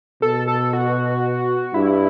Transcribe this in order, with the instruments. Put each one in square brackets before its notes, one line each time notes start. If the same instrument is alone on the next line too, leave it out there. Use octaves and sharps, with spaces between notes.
[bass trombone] B2 [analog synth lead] A4
[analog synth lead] A4
F#4
[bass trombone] G2 [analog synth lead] E4